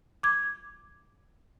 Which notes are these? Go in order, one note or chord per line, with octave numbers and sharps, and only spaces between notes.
D6 G#6